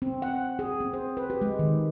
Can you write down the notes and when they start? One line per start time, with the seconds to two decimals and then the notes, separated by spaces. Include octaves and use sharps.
0.02 C4
0.22 F#5
0.59 G#4
0.80 C4
0.93 C5
1.17 B4
1.30 G4
1.41 G#3
1.59 D#3